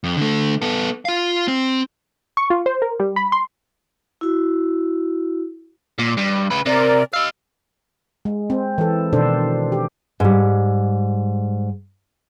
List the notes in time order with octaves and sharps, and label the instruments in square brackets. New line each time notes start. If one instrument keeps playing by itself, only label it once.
[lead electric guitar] F2
D3 A3
B3 A4
F4 F5
C4
[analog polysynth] C#6
F4
C5
A#4
G3
B5
C6
[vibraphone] E4 F#4
[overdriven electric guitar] A#2
G2
C#3 B4
[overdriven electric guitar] C3 [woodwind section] A#4 D5
[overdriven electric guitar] D#4 F5 [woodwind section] E6
[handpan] G#3
C4
E3 A4
B2 D#3 D4 A4 C5
G4
[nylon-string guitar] G#2 G3